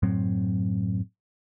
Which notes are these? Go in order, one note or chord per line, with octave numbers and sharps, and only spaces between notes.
F#2 A2 F#3 C4